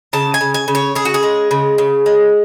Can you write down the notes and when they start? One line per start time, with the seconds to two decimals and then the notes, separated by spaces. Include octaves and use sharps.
0.13 C#3 A5
0.34 G#5
0.41 C#3
0.54 G#5
0.68 C#3
0.75 C#5
0.95 C#3 G#4
1.05 F#4
1.14 G#4
1.23 G#3
1.51 C#3
1.78 C#3
2.06 G#3